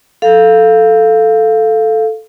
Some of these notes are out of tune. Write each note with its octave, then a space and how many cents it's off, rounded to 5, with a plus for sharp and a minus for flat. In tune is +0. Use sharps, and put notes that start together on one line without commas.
A4 +0 F5 +0